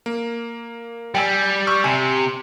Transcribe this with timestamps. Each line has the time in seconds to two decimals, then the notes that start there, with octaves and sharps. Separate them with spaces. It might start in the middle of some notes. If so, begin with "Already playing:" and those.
0.06 A#3
1.15 G3 G5 G#5 E6
1.67 C#6 E6 F6
1.84 C3 G#5